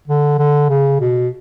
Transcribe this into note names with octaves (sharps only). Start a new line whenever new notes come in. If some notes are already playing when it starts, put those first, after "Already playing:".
D3
D3
C#3
B2